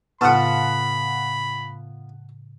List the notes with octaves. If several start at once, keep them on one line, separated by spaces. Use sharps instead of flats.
A2 C#3 B3 F4 F#5 A5 B5